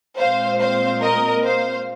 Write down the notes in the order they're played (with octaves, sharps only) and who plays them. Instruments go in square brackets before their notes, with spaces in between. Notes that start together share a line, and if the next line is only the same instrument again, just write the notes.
[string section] A#2 G#3 C4 C5 F5
C5 F5
A#4 D#5
C5 F5